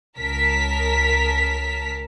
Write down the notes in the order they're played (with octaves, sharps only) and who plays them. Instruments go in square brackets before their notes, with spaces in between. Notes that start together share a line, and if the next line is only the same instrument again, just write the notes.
[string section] C#2 A#4 A5 B6